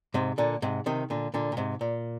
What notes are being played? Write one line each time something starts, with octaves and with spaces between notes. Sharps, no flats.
G#2 C3
A#2 D3
G#2 C3
C3 D#3
A#2 D3
A#2 D3
A#2
G#2 C3
A#2